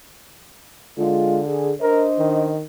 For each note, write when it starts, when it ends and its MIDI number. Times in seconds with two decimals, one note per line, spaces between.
0.98 1.75 50
0.98 1.38 56
0.98 1.38 65
1.47 1.72 68
1.81 2.54 62
1.81 2.07 70
1.81 2.54 72
1.81 2.54 75
2.19 2.64 51